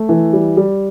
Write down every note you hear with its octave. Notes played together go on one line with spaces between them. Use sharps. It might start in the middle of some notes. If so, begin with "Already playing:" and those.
Already playing: A3
E3
G3
G3